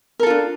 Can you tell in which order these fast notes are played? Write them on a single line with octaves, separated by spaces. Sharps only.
A#4 A4 F4 D4